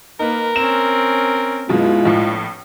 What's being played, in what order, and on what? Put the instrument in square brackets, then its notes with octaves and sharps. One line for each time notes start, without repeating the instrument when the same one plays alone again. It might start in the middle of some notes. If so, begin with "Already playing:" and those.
[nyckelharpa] A#3 B4 [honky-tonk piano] D#4 [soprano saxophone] A#4
[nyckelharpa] C4 C#4 [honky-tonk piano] E7
[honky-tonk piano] F#2 B2 [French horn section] G#3 E4 F4 [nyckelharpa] B4
[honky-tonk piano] A#1 A2